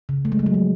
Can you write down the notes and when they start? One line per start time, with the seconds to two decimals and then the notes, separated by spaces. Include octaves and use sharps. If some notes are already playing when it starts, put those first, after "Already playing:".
0.09 C#3
0.25 A3
0.32 G#3
0.39 G3
0.46 F#3
0.54 F3